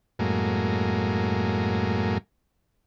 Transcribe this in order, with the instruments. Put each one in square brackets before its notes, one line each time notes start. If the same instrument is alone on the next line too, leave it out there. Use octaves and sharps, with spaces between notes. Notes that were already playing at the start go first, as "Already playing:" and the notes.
[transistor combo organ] F#2 A2 G#3 A#3